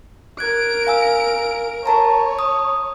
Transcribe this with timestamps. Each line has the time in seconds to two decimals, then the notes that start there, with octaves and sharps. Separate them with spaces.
0.39 A#4 F#6 G#6 D7
0.87 F5 G#5 E6
1.86 A#4 C#5 A5 A#5
2.39 D#6